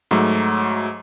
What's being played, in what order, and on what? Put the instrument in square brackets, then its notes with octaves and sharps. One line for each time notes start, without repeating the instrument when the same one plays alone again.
[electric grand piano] G#2 F#3 A3